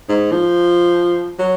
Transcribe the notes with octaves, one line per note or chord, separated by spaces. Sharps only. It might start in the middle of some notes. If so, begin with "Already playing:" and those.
G#2
F3
F#3